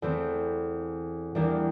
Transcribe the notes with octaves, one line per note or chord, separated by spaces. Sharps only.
E2 E3 A3 C4
E2 E3 G3 A#3 D4